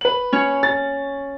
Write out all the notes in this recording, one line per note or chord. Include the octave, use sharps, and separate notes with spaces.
B4 F#7
C#4 C#5
A6